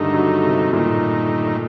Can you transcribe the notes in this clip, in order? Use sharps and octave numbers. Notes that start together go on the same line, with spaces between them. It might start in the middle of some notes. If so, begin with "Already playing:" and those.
Already playing: G2 D3 D#3 G3 A3 D#4
F#3
C3
G2 A#2 D#3 A3 D#4